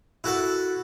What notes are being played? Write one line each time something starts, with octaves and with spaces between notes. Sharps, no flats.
E4 F#4 A4